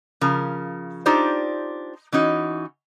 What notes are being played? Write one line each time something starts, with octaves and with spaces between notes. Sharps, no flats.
C#3 F3 A#4
D4 D#4 F4 G4 C5
E3 C#4 D#4 F#4